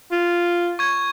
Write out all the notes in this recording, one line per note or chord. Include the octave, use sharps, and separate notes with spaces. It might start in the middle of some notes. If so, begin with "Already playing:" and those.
F4
C#6 G#6